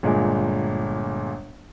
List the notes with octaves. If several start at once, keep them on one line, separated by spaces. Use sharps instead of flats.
G1 A#2 G#3